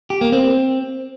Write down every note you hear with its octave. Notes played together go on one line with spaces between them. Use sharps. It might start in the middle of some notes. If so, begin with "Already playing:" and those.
G4
A#3
C4